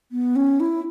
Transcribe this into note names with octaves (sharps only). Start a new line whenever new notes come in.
B3
C#4
E4